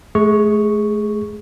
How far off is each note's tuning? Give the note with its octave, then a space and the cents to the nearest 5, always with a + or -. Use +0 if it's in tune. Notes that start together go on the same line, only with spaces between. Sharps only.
A3 -35 G#4 +0 C#6 +0